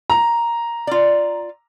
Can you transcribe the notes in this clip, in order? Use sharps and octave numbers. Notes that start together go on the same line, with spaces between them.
A#5
F4 D5